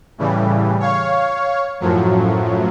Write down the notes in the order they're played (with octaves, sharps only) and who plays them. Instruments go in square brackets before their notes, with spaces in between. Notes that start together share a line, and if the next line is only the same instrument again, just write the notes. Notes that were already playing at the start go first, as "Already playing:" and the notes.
[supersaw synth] A2 C#3 E3 G3
C#5 F5 C#6
F#2 A2 F3 F#3